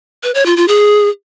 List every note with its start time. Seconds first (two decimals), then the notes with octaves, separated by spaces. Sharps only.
0.23 B4
0.35 C#5
0.46 F4
0.57 F4
0.68 G#4